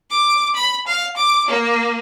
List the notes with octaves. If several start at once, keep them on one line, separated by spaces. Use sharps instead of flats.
D6
B5
F5
D6
A#3